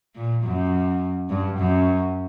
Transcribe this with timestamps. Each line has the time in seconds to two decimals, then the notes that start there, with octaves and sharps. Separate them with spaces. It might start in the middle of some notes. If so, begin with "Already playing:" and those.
0.15 A#2
0.43 F#2
1.29 G2
1.58 F#2